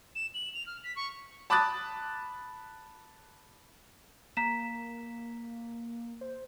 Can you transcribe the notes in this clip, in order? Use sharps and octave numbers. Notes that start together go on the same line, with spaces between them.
E7
F#7
F7
F6
B6
C#6
A5 B5 D6 D#6 F#6 A6
A#3 A#5 B6 E7
C5